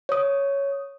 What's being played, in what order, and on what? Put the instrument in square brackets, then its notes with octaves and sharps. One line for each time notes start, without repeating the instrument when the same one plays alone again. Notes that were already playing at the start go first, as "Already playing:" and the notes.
[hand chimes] C#5 D#6